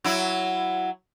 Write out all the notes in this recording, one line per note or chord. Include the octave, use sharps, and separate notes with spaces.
F#3 E4